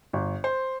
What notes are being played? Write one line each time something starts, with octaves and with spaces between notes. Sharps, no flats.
G1
C5